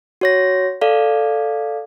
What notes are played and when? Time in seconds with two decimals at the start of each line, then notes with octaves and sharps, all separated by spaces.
0.21 F#4 C#5 A#6
0.81 A4 D5 F5